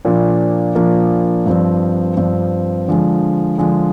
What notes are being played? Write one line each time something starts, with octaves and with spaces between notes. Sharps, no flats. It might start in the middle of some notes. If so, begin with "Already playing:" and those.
A#2 F3 A#3 D4
A#2 F3 A#3 D4
G2 F3 C4
G2 F3 C4
D3 F3 G#3
D3 F3 G#3